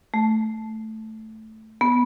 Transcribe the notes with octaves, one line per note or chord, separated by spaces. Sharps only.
A3
B3